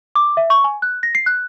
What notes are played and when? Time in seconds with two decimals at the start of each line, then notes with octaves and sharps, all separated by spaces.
0.15 D6
0.37 E5
0.50 C#6
0.64 G#5
0.82 F#6
1.03 A#6
1.15 C7
1.26 F#6